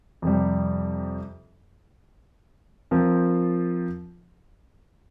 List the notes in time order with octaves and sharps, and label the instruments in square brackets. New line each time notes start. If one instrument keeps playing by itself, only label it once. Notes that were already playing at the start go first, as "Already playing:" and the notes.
[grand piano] F2 C3 G3
F3 C4 F4 A#4